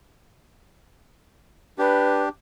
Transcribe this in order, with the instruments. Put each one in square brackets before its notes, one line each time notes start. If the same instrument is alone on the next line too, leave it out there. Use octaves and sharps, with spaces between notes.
[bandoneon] D4 G4 [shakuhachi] B4